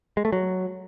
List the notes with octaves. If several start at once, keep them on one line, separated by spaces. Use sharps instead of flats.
G#3
A3
F#3